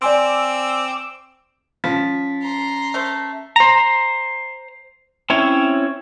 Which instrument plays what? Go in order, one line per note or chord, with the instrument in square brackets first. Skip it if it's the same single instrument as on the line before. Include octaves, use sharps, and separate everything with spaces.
[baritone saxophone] C4 [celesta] D5 G#5 C6 [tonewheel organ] D6 E6
[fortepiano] F3 [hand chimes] C#4 B6
[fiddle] A#5 C6
[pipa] A3 A#4 C5
[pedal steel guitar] C5 A#5
C4 C#4 E4 C#5